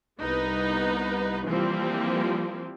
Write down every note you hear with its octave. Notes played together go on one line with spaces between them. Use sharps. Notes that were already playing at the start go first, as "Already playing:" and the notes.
C2 B3 D#4 B4
E3 F3 G3 A#3 C4